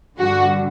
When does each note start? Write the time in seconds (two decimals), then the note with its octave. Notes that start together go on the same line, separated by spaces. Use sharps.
0.18 G2 D3 F#4